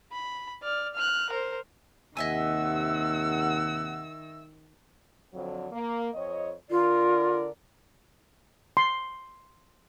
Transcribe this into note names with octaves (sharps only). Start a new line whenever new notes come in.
B5
D5 F6
F6 F#6
A#4 C5
D#2 C3 D#3 D#5 E5 F#5 G#5 E6
F2 D3 F#3
A#3
F2 C#5 D#5
D3 F4 A#4 D5
C6